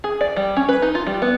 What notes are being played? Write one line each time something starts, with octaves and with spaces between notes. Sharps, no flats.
G#4
D5
G3
C#4
B4
D#4
F4
G3
B3